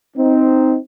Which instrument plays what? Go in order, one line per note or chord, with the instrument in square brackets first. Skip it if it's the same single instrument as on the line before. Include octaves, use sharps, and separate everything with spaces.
[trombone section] C4 D#4